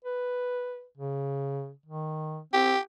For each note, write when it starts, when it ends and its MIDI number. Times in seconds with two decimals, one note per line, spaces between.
0.04 0.85 71
0.98 1.71 49
1.86 2.40 51
2.53 2.75 60
2.53 2.79 67